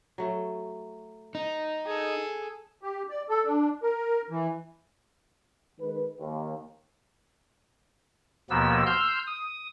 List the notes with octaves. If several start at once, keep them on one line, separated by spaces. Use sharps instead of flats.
F#3 A3
D#4
G#4 A4
G4
D5
A4
D4
A#4
E3
D#3 G#3 B4
D#2
D#2 B2 F3 A#3 B3 E6
C6 E6 F6 G6
D#6